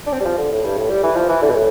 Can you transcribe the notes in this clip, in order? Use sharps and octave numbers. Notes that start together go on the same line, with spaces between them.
D4
C4
G3
F3
D3
A2
G2
A2
G3
E3
F3
E3
D3
B2
A2